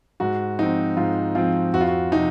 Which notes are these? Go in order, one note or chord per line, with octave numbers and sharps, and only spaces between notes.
G#2 F#4
F3 C4 D#4
G#2 F4
F3 C4 F4
F2 F#4
F4
F#4
C3 F3 D#4